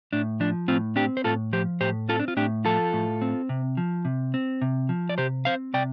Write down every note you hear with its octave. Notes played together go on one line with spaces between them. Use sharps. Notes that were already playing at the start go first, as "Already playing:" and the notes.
A2 D4
F3 D4
A2 C4 F4
C4 D4 G4
C5
A2 F4 A4
F3 G4 C5
A2 G4 C5
C4 F4 A4
D4
F4
A2 D4 G4
F3 F4 A4
A2
C4
C3
F3
C3
C4
C3
F3
D5
C3 G4 C5
C4 C5 F5
C3 D5 G5